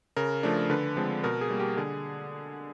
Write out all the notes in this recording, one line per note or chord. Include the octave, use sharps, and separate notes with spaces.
C#3 A#4
F3 A3 D4
D3 B4
F3 G#3 C4
B2 A#4
G#4
G3 A#3
G4
D3 G#4